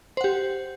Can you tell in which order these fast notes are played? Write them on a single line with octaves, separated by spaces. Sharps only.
C5 F#5 G4